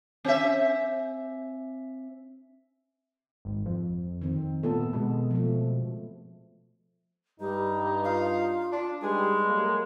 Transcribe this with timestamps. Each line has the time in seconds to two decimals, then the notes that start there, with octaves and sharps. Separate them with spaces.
0.25 C4 E5
3.45 G#1
3.66 F2
4.21 D#3 C4
4.63 A#2 A3 B3 A4
4.93 B2 G#3
5.31 F3 A3
7.40 G2 G3 D#4
8.05 F4 F5
8.72 D4
9.02 G3 G#3 D#4 G4 G#4 B4
9.46 F#3 A3 A#3